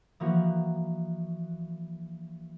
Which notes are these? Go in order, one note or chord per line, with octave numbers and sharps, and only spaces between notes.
E3 F3 A#3 F#4 A#4